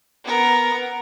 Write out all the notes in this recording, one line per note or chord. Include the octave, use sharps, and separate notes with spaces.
B3 A#4